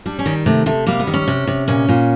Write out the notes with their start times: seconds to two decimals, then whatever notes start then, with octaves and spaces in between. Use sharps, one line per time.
0.06 G3 D4
0.19 C#4
0.26 D#3
0.46 C3 A3
0.66 C3 A3
0.86 G3 A#3
1.00 B3
1.07 D#3
1.14 C#4
1.28 C3
1.47 C3
1.68 A#2 C#4
1.89 A#2